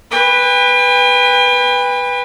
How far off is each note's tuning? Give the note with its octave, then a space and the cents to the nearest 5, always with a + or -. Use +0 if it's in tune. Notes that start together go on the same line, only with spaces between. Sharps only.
B4 +0 G5 +40